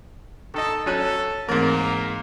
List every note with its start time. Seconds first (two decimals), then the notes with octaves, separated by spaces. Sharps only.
0.54 D#3 A4 D#5
0.86 F#3 C#4 A4 F#6
1.49 G#2 E3 A3 A#3 C4 A#4